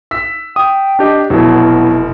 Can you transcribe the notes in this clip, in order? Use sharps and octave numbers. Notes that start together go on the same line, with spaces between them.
E6 B6
G5 D#6
D4 G4 D#5
F1 B2 F#3 E4